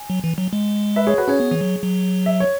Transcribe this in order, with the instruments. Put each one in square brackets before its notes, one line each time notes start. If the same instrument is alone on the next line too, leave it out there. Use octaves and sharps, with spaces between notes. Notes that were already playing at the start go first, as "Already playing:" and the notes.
Already playing: [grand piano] G#5
[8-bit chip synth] F#3
E3
F#3
G#3
[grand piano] B4 E5
G#4 C#5
F#4 B4
[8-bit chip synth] C#4 [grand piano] G#4 C#5
[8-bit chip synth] B3
E3
F#3
F#3
[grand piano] E5
C#5